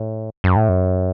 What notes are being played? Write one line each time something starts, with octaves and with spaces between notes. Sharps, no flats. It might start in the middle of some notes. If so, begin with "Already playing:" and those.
Already playing: A2
F#2
A2
F#2